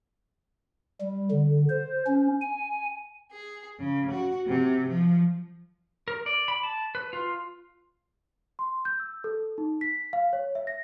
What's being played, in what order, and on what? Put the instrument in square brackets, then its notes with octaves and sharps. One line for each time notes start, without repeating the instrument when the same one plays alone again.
[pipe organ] G3
D3
C5
C#4
G#5
[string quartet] G#4
C#3
F#4
C3
F3
[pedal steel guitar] A#4
D5
B5
A5
B4
F4
[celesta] C6
G6
E6
A4
D#4
B6
F5
C#5
E5
A#6